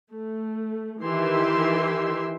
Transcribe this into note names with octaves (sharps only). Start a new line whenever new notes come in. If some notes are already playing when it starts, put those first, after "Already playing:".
A3
D#3 E3 G4 E5 C6